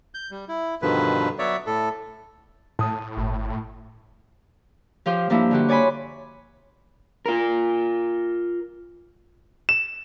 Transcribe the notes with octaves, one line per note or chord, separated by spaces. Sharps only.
G6
G3
E4
G2 B2 D3 D#3 F3 B4
F#3 B3 C#5 D5 E5
A2 A4
A2 A5 D#6
G1
F3 F4 G4 C5
G2 F3 A#3 D4 E4
D3 F#4 G4
C#5 D5 G#5 B5 C6
F4 A#4
E7